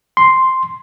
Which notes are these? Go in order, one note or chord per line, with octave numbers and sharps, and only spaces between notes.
C6